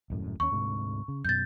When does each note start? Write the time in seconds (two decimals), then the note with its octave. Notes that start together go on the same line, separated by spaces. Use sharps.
0.10 D#1 F#2 A2
0.40 D#2 C#4 C#6
0.52 D2 G#2 C3
1.08 C#3
1.25 F#2 B2 G6 A6